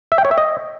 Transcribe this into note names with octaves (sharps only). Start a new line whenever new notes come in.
E5
G5
C#5
E5
D#5